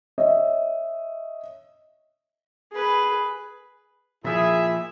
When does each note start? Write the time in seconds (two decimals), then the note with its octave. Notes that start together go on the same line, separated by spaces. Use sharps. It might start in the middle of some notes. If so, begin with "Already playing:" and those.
0.18 C#5 D#5 E5
2.72 G#4 B4
4.24 A#2 F3 E4 G#4 E5